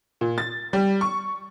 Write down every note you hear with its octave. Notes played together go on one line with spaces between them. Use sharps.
A#2
A6
G3
C#6